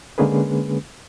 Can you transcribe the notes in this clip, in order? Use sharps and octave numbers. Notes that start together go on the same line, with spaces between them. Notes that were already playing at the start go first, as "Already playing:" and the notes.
D3 G#3 A#3 C#4 G#4 B4